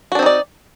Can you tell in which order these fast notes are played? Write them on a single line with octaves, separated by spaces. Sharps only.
F#4 D4 C4 D#4 D5